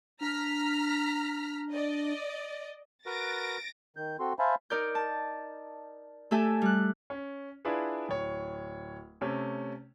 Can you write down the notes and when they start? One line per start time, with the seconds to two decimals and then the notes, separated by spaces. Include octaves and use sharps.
0.21 D4 A#5 F6 B6
1.71 D5 D#5
3.06 F#4 A#4 B4 A6 A#6 D7
3.97 D#3 G6
4.19 C4 F#4 A4 C6
4.39 C5 E5 F5 G#5 A5 B5
4.70 D#4 A#4 D5 G6
4.95 A5
6.31 A3 G4 A4 E5 G#5
6.62 G3 F#6
7.10 C#4
7.65 D4 E4 F4 G#4 B4
8.09 D1 C#5
9.21 C3 A3 C#4